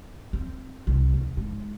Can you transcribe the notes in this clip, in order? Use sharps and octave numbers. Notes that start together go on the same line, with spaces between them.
C4
C2
D#2
G#2